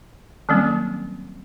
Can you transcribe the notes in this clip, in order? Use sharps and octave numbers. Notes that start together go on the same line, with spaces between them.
D#3 F#3 G3 A#3 C4 C#4